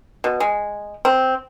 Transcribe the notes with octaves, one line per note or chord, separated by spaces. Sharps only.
B2
G#3
C4